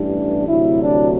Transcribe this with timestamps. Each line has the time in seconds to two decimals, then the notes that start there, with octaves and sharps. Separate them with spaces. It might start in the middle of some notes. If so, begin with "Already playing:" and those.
Already playing: A1 G2 E3 G3 D4
0.47 D2 C3 F#3 E4
0.81 D4